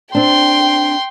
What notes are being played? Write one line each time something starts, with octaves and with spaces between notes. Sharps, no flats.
C4 D4 G5 C6